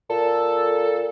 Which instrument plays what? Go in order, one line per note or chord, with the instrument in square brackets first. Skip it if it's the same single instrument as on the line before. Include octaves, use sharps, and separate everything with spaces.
[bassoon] A#2 [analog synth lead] A4